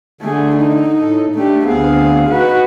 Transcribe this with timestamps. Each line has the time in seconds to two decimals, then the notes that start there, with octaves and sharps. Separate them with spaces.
0.21 D3 A3 G#4
0.55 D#4
0.99 A2 A4
1.35 A3 D4 G4
1.66 D2 B3 C4 G#4 F5
2.28 D#4 F#4 B4